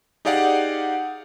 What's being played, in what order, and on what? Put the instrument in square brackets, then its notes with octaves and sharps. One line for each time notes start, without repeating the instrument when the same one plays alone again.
[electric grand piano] D#4 G4 G#4 D5 F5 F#5